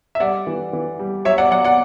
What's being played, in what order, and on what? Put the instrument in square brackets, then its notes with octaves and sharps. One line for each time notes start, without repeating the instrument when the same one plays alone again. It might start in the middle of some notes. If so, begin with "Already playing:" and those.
[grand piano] E5
G3 D5 F#5
E3
E3
G3
F#3 C#5 E5
D5 F#5
F#3 D5 F#5
D5 F#5